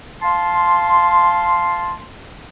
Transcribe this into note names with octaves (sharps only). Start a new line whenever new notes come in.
F5 A5 C6